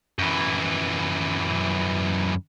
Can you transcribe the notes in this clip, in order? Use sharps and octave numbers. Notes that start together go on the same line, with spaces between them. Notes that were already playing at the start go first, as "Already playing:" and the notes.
F#2 E3